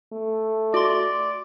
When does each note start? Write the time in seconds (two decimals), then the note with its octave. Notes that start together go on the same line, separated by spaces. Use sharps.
0.13 A3
0.74 F#4 D5 C6